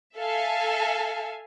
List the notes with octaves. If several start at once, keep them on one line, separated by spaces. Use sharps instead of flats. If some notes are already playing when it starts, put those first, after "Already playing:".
A4 E5 F5 G#5